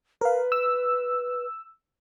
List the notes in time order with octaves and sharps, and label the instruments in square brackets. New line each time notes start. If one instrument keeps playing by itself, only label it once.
[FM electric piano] A#4 F5 [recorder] B4
[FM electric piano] E6